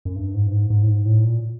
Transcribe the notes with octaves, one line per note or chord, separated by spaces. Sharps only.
F#2
G2
G#2
G2
G#2
G#2
A2
G#2
A2
A#2